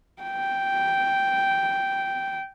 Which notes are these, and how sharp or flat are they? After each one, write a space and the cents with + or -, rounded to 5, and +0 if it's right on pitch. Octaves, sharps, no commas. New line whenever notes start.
G5 -5